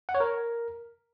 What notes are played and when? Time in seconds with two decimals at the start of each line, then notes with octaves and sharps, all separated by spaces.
0.09 F#5
0.15 C#5
0.20 A#4